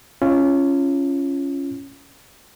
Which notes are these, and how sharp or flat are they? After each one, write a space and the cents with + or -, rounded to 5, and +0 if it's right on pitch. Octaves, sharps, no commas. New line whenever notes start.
C#4 +0 F4 -25